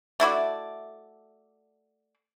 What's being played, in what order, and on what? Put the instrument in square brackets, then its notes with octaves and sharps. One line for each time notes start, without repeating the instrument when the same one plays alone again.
[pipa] A3 E4 F#4 D5